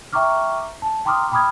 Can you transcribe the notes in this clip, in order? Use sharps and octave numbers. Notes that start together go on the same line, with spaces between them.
E5 G5 A#5 C#6 D6 F6
A5
G5 A#5 C6 D6 D#6 F6
G5 B5 D6 D#6 F6 G#6